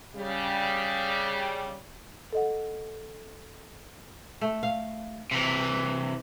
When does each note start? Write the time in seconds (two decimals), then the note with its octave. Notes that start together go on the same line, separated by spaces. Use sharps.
0.16 C#3 G3
2.33 A4 D#5 F#5
4.41 A3
4.63 F5
5.31 C3 E3